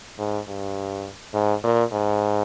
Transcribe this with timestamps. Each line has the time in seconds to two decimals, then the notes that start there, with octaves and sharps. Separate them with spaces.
0.19 G#2
0.48 G2
1.34 G#2
1.63 A#2
1.92 G#2